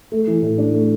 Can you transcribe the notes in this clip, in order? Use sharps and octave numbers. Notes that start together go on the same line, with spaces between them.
A3
E3
A2
D4
A3